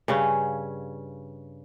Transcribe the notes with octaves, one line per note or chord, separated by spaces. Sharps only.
G2 C#3 C#4